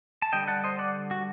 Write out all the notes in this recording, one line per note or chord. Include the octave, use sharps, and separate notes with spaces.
A5
D3 G3 D4 D#5 G5
F#5 A5
C5 D#5
D5 F#5
F#4